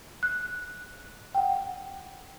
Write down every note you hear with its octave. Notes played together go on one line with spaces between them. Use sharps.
F#6
F#5 G5